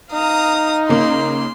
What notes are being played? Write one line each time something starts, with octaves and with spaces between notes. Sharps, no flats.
D#4 F5 A#5 D#6
C#3 A#3 C6